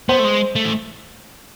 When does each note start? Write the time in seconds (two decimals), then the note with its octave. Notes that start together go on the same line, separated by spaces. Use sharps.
0.09 B3 C5
0.19 A3
0.24 G#3
0.55 A3
0.64 E3